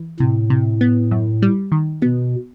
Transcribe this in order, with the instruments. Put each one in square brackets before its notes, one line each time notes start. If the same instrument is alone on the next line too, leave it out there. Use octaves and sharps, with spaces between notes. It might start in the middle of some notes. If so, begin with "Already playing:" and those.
Already playing: [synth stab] E3
[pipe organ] A2 [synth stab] C3
[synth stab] C3
B3
F#2
G3
D#3
[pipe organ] B2 [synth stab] B3